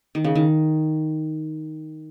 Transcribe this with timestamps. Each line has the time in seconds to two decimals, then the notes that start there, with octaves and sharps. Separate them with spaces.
0.15 D#3
0.24 C#3
0.35 D#3